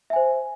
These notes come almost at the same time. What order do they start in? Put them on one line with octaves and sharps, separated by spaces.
E5 G#5 C5